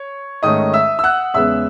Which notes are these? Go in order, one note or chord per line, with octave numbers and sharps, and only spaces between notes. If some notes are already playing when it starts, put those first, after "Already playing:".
Already playing: C#5
G#2 D#3 A3 C#4 D#5 D#6
E5 E6
E6
F#5 F#6
E2 C#3 G#3 B3 E5 E6